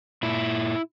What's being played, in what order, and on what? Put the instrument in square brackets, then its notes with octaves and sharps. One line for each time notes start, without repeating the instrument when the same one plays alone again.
[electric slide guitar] A#2 E4